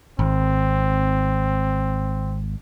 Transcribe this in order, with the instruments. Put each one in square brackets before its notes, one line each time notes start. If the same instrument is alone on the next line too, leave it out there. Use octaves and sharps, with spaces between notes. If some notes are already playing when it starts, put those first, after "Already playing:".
[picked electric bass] G#1 [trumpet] C4